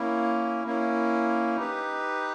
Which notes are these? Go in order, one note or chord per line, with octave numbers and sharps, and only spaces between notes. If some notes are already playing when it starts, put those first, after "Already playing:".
Already playing: A#3 C#4 E4
A#3 C#4 E4
D#4 G4 B4